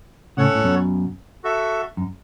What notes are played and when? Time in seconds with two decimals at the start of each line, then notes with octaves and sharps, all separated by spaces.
0.37 A2 C#3 C#4 A4 C#5 F#5
0.55 A2
0.64 F#2 B2
1.44 F#4 A4 E5
1.97 F#2